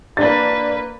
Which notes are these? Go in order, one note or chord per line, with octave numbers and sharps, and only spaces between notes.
A#3 D4 B4 A6